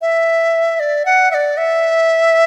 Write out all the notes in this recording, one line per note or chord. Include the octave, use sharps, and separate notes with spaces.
E5
D5
F#5
E5
D5
E5